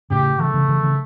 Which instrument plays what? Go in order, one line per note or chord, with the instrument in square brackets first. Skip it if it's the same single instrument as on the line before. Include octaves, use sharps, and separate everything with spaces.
[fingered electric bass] A2 C#3 [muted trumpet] G4
[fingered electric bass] C#3 E3 [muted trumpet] A3
[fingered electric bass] C#3 E3
C#3 E3
C#3 E3